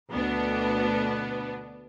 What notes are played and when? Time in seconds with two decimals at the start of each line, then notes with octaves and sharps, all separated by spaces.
0.11 D2 B2 B3 D4